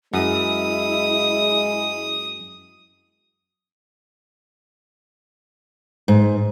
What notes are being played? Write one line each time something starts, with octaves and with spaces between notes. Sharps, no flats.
F#2 G#3 E4 D#6
G#2